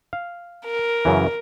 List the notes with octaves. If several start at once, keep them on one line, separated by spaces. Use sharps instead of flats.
F5
A#4
F#2 C#3 E3